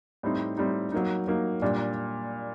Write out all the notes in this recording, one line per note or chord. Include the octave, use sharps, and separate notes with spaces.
A2 G3 C4 D#4
A2 G3 C4 D#4
F#3 A#3 D#4
F#3 A#3 D#4
A#2 G3 D4